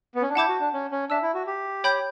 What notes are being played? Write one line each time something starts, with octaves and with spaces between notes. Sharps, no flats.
B3
C#4
D4
E4 F#5 A5 D6 G6
F#4
D4
C#4
C#4
D4 E5 A5 E6
E4
F#4
G4
C#5 G5 B5 D6 G6